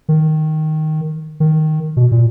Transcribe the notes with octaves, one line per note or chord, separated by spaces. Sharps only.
D#3
D#3
B2
A#2